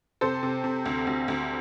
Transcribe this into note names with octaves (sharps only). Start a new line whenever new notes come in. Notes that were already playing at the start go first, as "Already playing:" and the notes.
C3 A4 C5
C3
C3
D2
D2
D2